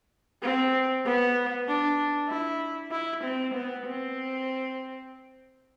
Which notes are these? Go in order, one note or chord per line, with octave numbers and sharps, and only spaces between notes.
C4
B3
D4
E4
E4
C4
B3
C4